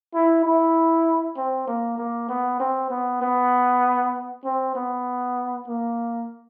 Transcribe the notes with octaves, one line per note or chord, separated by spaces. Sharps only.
E4
E4
C4
A#3
A#3
B3
C4
B3
B3
C4
B3
A#3